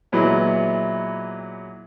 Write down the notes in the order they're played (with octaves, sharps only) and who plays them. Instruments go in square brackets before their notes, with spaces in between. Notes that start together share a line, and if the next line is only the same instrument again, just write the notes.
[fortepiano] A#2 E3 F#3 G#3 B3 E4